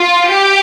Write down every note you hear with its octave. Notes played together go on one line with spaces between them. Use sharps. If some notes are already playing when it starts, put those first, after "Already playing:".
Already playing: F4
G4